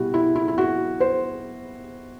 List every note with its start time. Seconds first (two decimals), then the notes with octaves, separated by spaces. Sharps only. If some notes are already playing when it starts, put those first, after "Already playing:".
Already playing: B2 G3 E4 F#4 G4
0.14 E4
0.36 E4
0.48 E4
0.58 F#4
1.00 C5